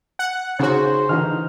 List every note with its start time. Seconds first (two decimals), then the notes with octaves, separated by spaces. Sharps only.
0.19 F#5
0.59 C#3 C#4 D#4 F#4 G#4 C5
1.09 D3 E3 D#4 F6